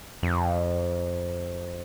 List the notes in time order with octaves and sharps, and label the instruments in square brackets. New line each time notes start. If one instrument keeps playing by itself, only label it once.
[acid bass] F2